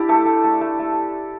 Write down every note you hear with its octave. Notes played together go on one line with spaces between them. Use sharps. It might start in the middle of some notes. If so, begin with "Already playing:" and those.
Already playing: D4 E4 G4 D5
A3 A4
A3
A3
A3
A3